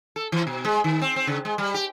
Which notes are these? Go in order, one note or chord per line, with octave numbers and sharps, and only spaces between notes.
A4
E3
B2
G#3
D#3
C4
C4
C#3
G#3
G3
G4